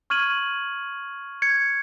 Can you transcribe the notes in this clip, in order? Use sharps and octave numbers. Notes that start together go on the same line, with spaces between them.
C#6 F6 G#6 D#7 F#7
G#6 C#7